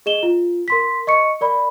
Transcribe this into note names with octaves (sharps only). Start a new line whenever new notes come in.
G#4 D#5 E7 G7
F4
A#4 C6 B6
D#5 C#6 C#7
A#4 D5 B5